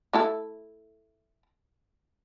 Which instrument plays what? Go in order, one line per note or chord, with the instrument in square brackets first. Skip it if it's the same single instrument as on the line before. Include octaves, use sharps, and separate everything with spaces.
[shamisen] A3 E4 A4